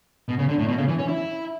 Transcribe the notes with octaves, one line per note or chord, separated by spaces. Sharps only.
B2
C#3
D3
A2
B2
C#3
E3
C#4
E4